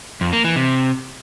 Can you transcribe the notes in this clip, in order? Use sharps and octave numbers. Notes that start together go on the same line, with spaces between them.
F2
A#3
E3
C3